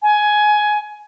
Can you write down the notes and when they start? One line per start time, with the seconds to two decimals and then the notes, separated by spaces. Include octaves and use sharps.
0.02 G#5